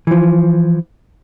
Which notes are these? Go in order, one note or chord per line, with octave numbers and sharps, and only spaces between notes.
E3 F3